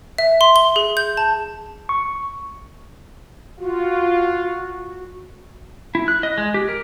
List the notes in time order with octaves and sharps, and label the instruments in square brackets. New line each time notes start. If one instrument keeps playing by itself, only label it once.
[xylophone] E5
C6
G7
G#4
G6
A5
[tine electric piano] C#6
[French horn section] F4 [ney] F#4
[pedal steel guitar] E4
F#6
D#5
G#3
G4
A#4